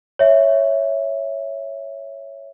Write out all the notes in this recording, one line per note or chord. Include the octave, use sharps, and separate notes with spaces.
C#5 E5